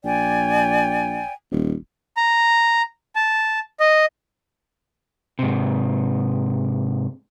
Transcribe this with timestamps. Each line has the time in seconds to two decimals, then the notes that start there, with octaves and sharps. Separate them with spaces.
0.04 A#1 D5 G5 G#5
1.52 D#1
2.17 A#5
3.16 A5
3.80 D#5
5.39 G#2 C3